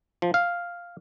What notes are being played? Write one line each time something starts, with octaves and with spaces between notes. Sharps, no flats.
F3
F5